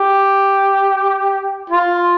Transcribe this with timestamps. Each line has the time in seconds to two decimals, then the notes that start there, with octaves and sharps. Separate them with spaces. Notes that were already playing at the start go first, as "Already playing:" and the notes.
Already playing: G4
1.70 F4